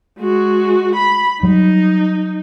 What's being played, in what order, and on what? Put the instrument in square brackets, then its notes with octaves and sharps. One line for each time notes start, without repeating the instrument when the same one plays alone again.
[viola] G#3 F#4
B5
[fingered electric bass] F#3 G3 [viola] D#4